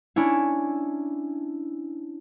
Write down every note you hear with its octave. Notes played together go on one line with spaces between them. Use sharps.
C#4 D4 E4